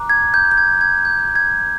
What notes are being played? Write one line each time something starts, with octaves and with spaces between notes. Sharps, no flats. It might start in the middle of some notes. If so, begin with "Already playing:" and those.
Already playing: A#5 D6 F#6
G#6
G6
G6
G#6
G#6
G6
G#6